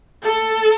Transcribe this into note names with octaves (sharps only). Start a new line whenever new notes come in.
A4